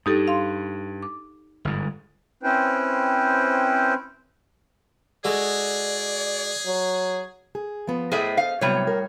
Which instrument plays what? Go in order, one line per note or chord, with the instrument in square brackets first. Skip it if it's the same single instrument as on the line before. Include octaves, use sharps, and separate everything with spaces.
[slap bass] G2 [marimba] D#4 G4 A4
[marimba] F5 C6
D6
[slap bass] G1 G#2
[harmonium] C4 C#4 E4 B4 C5 G5
[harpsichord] G#3 F#4 A4 [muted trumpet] G#4 [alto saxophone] D5
[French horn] F#3
[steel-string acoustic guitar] G#4
F3 B3
[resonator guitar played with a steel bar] A2 G#4 E5 [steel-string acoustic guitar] A4 C5 D#5
[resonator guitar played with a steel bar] F5
[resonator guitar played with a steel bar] A2 G3 C#5 [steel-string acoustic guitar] C3 F#3 B3
[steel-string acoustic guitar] A#4